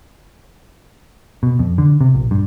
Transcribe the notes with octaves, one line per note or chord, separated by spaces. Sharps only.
B2
F2
D3
C3
A#1
G2